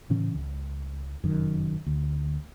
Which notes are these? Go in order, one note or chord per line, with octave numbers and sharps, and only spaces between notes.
A2 C#3 E3 C#4
C#2
F1 F#2 D#3
D2